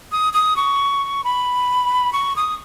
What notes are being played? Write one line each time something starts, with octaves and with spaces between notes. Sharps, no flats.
D#6
D#6
C#6
B5
C#6
D#6